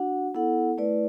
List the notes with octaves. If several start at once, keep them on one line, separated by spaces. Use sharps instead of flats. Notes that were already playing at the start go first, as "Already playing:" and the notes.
Already playing: D4 F#4 F#5
B3 E4 A4 F#5
A3 E4 B4 D5